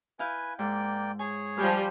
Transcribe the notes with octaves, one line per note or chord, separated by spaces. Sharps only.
E4 B4 F5 G#5 G6
G#2 A#3 D5 G5
G#4 C#5 G#5
F3 G3 G5 G#5 F6